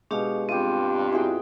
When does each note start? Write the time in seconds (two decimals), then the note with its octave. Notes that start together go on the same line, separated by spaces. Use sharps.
0.11 B2 G#3 D4 G4 F5 C#6
0.49 G2 C4 F4 G4
1.12 E4 F#4 G#4 G5